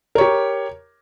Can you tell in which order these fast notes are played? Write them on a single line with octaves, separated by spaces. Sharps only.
A#4 C#5 G4